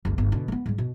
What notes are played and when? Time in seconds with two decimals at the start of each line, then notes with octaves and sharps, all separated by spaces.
0.05 F#1 C2
0.18 G1 B3
0.32 B2 D3
0.48 A3 B3
0.66 G#2 G3
0.78 B2